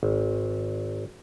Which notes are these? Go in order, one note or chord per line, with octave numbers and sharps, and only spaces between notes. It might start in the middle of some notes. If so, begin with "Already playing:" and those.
G#1